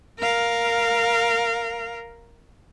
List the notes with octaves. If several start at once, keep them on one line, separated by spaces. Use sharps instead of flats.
A#4 F5